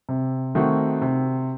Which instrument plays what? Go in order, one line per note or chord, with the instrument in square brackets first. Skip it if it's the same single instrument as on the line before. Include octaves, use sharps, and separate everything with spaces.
[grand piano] C3
D#3 A3 C4 F#4
C3